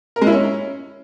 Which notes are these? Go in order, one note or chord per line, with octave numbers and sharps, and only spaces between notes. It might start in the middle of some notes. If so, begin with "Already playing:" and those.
A#4
G#3
E4
C#4